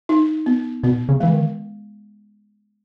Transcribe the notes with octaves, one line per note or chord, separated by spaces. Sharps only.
D#4
B3
B2 B3
C#3
E3 G#3
D#3